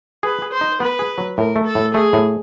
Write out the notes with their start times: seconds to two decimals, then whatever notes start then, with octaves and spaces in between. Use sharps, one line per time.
0.23 G#4 B4
0.42 G#4
0.52 C5
0.61 D#4
0.80 B3 B4
0.99 G#4
1.18 F#3
1.37 A2 A#4
1.56 A3
1.65 A4
1.75 A2
1.94 A3 G#4
2.13 A2